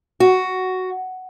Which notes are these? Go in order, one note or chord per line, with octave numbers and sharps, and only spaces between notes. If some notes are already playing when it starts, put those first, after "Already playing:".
F#4